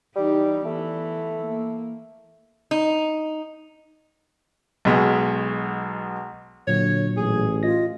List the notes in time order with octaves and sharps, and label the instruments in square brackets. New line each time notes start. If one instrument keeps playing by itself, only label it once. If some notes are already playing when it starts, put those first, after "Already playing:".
[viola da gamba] E3 D#4 G4 [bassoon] G3
[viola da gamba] E3 B3 [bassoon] A3
[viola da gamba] A#3
[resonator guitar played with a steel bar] D#4
[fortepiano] B1 B2 G#3
[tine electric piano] A#2 F#3 [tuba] D3 [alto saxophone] C#5
[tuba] A1 [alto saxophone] G#4
[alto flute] F4 [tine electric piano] D#5 A#6